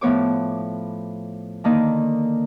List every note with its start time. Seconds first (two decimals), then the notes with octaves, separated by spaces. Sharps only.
0.01 A2 F3 B3 C#5 D6
1.64 D3 D#3 A#3 D#4